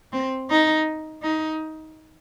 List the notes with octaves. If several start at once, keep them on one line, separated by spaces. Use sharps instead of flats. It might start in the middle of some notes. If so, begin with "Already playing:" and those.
C4
D#4
D#4